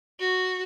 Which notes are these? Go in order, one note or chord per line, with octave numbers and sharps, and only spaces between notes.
F#4